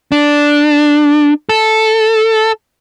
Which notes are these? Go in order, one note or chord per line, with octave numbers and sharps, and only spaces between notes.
D4
A4